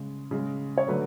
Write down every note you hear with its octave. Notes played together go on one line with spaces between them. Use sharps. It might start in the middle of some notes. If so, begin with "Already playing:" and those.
Already playing: C#3 G#3
C#3 G#3
C#5
D3 F#3 A3 B4